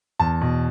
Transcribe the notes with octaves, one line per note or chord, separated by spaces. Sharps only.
E2 A5
B2